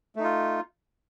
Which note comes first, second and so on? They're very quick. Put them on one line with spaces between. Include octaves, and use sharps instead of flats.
A3 D#4 F4